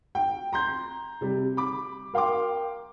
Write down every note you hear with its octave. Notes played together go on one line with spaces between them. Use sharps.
G5
A#5 C6 G6
C3 G3
B5 D6
A#4 F5 G5 C6 D6